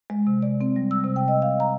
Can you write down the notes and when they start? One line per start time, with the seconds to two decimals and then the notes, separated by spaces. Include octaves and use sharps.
0.10 G#3
0.27 C3
0.42 D5
0.61 C4
0.76 G3
0.91 E6
1.04 C3
1.16 G5
1.28 D#5
1.42 F5
1.60 A#5